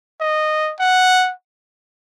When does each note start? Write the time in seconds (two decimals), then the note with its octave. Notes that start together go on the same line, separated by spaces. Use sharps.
0.20 D#5
0.79 F#5